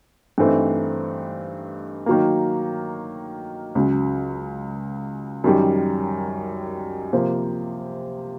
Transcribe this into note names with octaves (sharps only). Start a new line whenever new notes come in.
G2 E3 A3 C4 D#4
D#3 F#3 A#3
C#2 C#3 F#3
F#2 D#3 G3
C3 F3 A#3